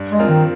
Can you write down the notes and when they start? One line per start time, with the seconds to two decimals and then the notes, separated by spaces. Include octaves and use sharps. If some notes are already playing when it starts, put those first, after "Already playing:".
Already playing: G2
0.10 G#3
0.19 F3 C4 F4 A#4
0.28 D#3